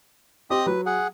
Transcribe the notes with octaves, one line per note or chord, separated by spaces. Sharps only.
C4 G4 D#5 D#6
F#3 B4
G#4 F#5